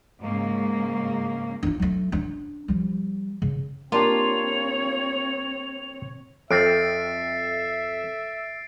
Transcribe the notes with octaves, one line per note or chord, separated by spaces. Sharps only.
G#2 C#3 A#3
D4 F4
F#3 A3
C#4 D4
F3 G3
C#3
A#3 C4 D4 F4 G4 C#5 F7
F2 C4 A4 E5 A6 C7 D7